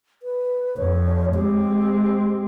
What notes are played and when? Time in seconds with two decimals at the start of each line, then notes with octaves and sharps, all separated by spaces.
0.23 B4
0.77 F2 C#5
1.34 G#3 C4 G4